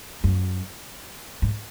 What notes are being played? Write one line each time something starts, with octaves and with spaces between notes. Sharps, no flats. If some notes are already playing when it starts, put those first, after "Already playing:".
F#2
G#2